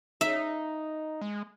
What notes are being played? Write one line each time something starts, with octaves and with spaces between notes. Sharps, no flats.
D#4 E5
G#3